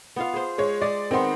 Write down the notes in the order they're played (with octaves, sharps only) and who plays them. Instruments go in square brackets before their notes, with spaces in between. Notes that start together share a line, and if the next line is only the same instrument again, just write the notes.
[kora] B3 F4 F5
G#4 C5
[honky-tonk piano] G#3 C#5
[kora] G#3 [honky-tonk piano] D5
[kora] D#3 B3 [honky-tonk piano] C4 C6